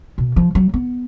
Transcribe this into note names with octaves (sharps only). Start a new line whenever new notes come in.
B2
F3
F#3
B3